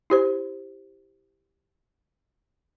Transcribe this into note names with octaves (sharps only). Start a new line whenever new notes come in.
E4 G4 C5